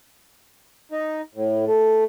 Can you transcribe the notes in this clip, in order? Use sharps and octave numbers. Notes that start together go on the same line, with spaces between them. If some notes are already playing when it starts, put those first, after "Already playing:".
D#4
A2
A3